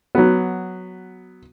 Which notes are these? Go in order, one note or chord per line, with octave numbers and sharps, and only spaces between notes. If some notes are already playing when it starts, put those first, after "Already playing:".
F#3 B3